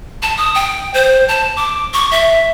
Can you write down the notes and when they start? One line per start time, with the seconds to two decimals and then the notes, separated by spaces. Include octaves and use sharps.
0.22 A5
0.37 D#6
0.55 G5
0.94 C5
1.28 A5
1.57 D6
1.93 C#6
2.11 E5